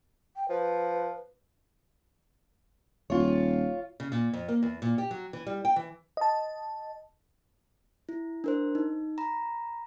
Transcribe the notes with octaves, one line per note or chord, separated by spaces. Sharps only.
G5
F3 B4
D#1 F4 C#5
C#3
A#2
F2
A#3
E2
A#2
G4
F#3
E3
G3
G5
E3
D#5 A5
E4
D4 A#4 C5
D#4
A#5 B5